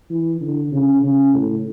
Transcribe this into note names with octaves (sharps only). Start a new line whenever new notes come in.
E3
D3
C#3
C#3
A2